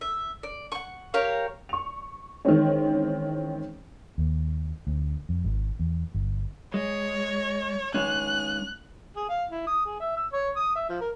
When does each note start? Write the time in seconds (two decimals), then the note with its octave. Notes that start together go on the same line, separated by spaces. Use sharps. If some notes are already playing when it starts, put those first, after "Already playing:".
0.01 E5
0.43 D5
0.72 F#5 C#6
1.14 G4 A#4 C#5 F5
1.69 C#6 F7
2.45 D#3 E3 G#3 C4 C#4
4.18 D#2
4.87 D2
5.29 F2
5.44 G#1
5.79 E2
6.14 G1
6.74 G#3 C#5
7.94 D#3 G#3 C#4 F#6
9.16 G#4
9.29 F5
9.50 E4
9.67 D#6
9.86 G#4
10.00 E5
10.17 E6
10.33 C#5
10.56 D#6
10.75 E5
10.89 F3
11.01 A#4